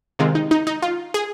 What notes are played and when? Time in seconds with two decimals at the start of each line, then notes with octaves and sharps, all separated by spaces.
0.19 C3 D#3 G#3 C4 F4
0.35 D#4
0.51 D#4
0.67 D#4
0.82 F4
1.14 G#4